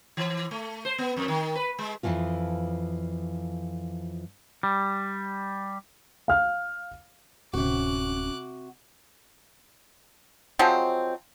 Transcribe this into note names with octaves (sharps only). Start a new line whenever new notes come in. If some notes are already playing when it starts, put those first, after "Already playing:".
E3
A3
C5
B3
F2
D#3
B4
G#3
F2 A#2 E3 F3 F4
G3
F5 F6
D1 C3 C#4 F#4 D6 F#6
F3 F#3 G#3 C4